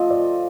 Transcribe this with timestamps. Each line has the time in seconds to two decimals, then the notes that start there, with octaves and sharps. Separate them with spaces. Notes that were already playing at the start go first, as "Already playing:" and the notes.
Already playing: F3 A3 C4 F4 D#5
0.11 D5